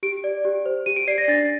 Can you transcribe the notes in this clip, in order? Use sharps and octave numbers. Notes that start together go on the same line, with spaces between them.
G4 D7
D5
G4
C5
G4 D#7
D7
D5 C7
A#6
D4 A6